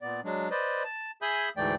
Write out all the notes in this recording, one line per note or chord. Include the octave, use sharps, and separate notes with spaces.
A#2 B3 D5
F#3 G#3 D4
B4 C5 D5 D#5
A5
G#4 E5 G#5 B5 D#6 G6
D2 G#2 E3 A3 D5 G5